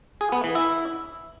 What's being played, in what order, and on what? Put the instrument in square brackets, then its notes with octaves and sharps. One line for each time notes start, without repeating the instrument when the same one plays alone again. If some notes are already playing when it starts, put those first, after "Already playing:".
[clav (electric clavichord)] G#4
B3
E3
E4